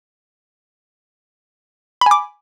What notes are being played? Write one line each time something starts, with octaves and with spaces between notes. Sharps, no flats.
G#5 B5 D6